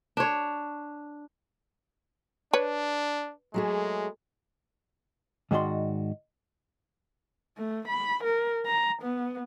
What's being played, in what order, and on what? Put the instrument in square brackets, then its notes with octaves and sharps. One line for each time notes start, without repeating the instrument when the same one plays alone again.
[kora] D4 C#5
[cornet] D4 [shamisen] B4 C#5
[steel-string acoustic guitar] F#3 A3 G#4 [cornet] G#3
[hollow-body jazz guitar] G#2 D#3 D4 F#4 D5 C6
[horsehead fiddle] A3
B5
A#4
A#5
B3